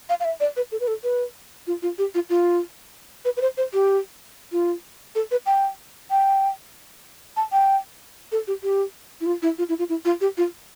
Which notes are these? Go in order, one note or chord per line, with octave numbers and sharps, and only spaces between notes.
F5
F5
E5
D5
B4
A4
B4
A4
B4
F4
F4
G4
F4
F4
B4
B4
C5
C5
G4
F4
A4
B4
G5
G5
A5
G5
A4
G4
G4
E4
F4
E4
F4
E4
F4
E4
F4
G4
F4